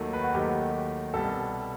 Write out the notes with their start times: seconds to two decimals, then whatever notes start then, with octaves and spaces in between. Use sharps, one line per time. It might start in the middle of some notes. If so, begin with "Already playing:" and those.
Already playing: D#2 D#3 F#3 A3
0.13 B4
0.24 F#4
0.33 D#2 D#3 F#3 A3 G4
1.14 C2 B2 G3 A4